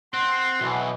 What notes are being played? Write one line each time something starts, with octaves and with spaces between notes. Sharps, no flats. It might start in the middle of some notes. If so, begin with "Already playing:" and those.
C4 F#5 C6
B1 B2 E3